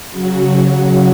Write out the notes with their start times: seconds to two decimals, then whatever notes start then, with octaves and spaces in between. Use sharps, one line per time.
0.11 C#3 F#3 F#4
0.56 F#4